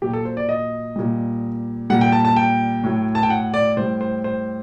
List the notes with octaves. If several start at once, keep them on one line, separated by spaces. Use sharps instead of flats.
A#2 F#3 G4
A4
C5
D5
D#5
A#2 G3
A#2 G3 F#5
G5
A5
A5
G5
A2 F#3
A5
G5
F#5
D5
A2 G3 C5
C5
C5